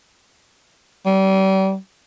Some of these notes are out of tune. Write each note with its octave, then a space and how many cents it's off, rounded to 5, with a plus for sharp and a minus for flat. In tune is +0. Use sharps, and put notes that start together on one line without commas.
G3 -35